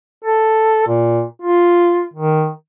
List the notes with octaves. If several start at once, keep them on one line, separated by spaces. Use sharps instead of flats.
A4
A#2
F4
D#3